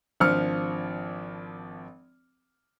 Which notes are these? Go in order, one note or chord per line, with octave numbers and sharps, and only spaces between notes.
G#1 F3 D4 F6 C#7